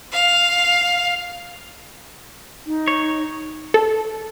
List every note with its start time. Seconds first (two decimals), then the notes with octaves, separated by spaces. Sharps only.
0.12 F5
2.67 D#4
2.88 C#5
3.74 A4